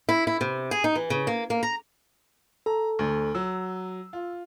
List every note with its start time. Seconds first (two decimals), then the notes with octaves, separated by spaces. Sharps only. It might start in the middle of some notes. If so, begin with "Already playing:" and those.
0.09 E4
0.27 E4
0.41 C3
0.71 G#4
0.84 D#4
0.95 E3
1.10 C#3
1.27 A#3
1.50 A#3
1.63 A#5
2.66 A4 A#5
2.99 D2
3.35 F#3 E6
4.13 F4